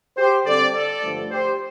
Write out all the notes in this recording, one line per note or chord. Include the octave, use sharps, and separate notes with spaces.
G4 C5
D3 G3 C4 A4 D5
A4 D5
G2 D3 F3 A3
G4 C5